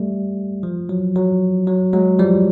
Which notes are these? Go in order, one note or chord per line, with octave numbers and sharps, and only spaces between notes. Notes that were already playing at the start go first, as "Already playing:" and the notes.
Already playing: G3 A3
F3
F#3
F#3
F#3
F#3 G#3
F3 G3